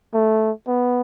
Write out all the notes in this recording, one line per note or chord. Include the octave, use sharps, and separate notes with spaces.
A3
B3